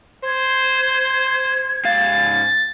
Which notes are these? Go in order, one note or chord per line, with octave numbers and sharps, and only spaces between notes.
C5 G#6
G#2 F5 A6